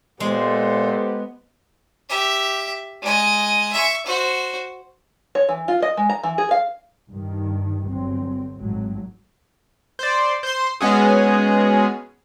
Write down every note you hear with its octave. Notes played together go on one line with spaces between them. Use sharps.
A#2 G#3 B3 G4 A4 C5
G4 E5
G#3 D#5
E5 C#6
F#4 C5
C#5
E3
F4
D#5
G#3
A#5
E3
G#4
F5
G2 D#3
G1 F#3 C4
G#1 A2 F#3
C5 D5
C5 C6
G#3 B3 C#4 F#4 G#4